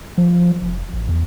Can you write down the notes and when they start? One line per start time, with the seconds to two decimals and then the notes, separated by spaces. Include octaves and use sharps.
0.18 F3
0.62 F1
0.93 A1
1.09 E2